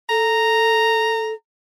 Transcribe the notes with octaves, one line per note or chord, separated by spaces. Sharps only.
A4 A#5